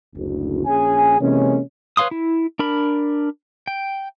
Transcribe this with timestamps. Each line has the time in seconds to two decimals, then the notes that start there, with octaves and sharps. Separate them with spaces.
0.16 F#1 D2
0.66 A#1 C#4 G#4 G#5
1.20 C3 E3 G#3 A#3 C#4
1.97 B4 C#5 F5 C6 D#6
2.11 E4
2.59 D4 A#4 B5
3.67 G5